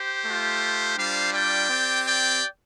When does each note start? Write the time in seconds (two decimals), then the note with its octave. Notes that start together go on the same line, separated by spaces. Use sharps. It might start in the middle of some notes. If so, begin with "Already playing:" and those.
Already playing: G4 C5
0.24 A3 F4
0.97 G3 D4 F4 C5 F5
1.33 D5 G5
1.70 C4 G4
2.06 D5 G5